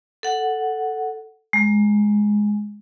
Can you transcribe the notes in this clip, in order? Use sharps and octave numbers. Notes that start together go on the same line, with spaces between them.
A4 F#5
G#3